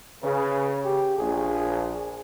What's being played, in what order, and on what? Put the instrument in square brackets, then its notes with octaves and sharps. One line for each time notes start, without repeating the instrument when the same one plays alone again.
[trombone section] C#3 [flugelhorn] B4
[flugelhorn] G4
[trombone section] A#1 [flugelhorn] G#4